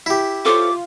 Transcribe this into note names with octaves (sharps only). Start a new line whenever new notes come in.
E4 G4
F4 A4 C5 C#5 D6